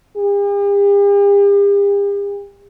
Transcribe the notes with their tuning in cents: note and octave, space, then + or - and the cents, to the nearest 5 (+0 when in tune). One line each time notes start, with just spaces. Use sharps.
G4 +45